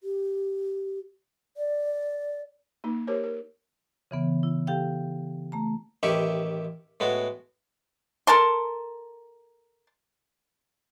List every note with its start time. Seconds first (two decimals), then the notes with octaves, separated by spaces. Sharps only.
0.03 G4
1.57 D5
2.84 A#3 D#4
3.07 G4 A#4 C5 C#5
3.24 A#4
4.11 C#3 E3 B3
4.43 E4
4.67 G4 A4 F5 G5
5.52 A3 A#5
6.03 A1 D#3 E4 G4 C#6
7.00 A2 G#3 B3 F#4
8.27 A4 A#4 A5 C6